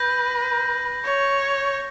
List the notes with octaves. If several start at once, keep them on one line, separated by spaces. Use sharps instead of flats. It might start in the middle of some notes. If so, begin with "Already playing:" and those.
Already playing: B4 G6 A#6
C#5